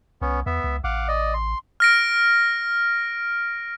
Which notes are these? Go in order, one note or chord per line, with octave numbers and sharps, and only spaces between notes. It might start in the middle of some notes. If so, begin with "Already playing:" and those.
C2 B3 C#4
E2 B3 E5
C#2
A1 F5 F#5 D6
D5 D#5
C6
F6 A#6 D7